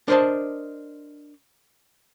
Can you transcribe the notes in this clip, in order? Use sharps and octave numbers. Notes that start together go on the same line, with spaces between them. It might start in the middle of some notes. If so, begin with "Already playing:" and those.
D4 A#4 C5 D#5 A5